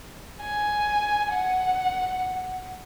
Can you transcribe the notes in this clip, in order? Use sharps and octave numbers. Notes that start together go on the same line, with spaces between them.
G#5
F#5